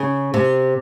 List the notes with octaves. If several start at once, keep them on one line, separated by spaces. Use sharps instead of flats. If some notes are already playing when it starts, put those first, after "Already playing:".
Already playing: C#3
C3